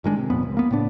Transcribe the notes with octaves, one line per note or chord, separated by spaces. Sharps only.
G1 D#3 G#3 D4
C3
F1 F2 A#2 B3
C#2
A#3 B3
A2 C#3 B3 D4